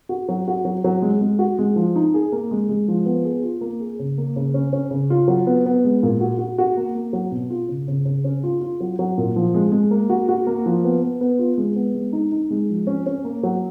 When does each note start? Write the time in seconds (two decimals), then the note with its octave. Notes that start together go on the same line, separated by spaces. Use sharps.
0.09 F#4
0.29 F#3
0.47 F#4
0.65 F#3
0.84 F#3
1.02 G#3
1.21 G#3
1.39 F#4
1.59 G#3
1.76 F3
1.96 D#4
2.14 G#4
2.32 A#3
2.51 G#3
2.69 G#3
2.88 F3
3.06 B3
3.24 G#4
3.43 F4
3.61 A#3
3.80 G#4
3.99 C#3
4.18 A#3
4.36 C#3
4.54 C#4
4.73 C#4
4.91 C#3
5.10 F4
5.28 F#3
5.47 B3
5.66 B3
5.84 G#3
6.03 A#2
6.20 F#4
6.39 F#4
6.58 F#4
6.77 A#3
6.94 A#3
7.13 F#3
7.31 B2
7.50 F4
7.68 C#3
7.88 C#3
8.05 C#3
8.24 C#4
8.43 F4
8.61 F4
8.80 F#3
8.99 F#3
9.18 A#2
9.36 F3
9.54 G#3
9.72 G#3
9.91 A#3
10.10 F#4
10.29 F#4
10.47 A#3
10.66 F3
10.84 B3
11.02 B3
11.21 B3
11.39 F4
11.58 G#3
11.76 B3
11.94 G#3
12.13 D#4
12.32 D#4
12.50 G#3
12.69 F3
12.87 C#4
13.06 C#4
13.24 A#3
13.43 F#3